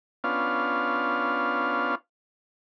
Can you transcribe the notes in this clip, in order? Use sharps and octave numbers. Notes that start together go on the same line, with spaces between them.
B3 C#4 D4 F4 F5